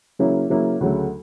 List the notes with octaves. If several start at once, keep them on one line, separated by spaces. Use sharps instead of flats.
C#3 F#3 A#3 C#4 E4
C#3 F#3 A#3 C#4 E4
D2 C#3 F#3 A3